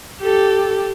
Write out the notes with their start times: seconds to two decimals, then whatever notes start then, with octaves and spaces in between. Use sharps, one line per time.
0.22 G4 A4